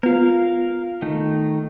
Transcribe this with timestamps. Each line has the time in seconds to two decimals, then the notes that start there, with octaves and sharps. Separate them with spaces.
0.03 B3 F4 A#4 F5
1.02 D#3 A3 D#4